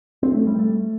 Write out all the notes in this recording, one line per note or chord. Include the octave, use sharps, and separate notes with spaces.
C4
A3
G3
A3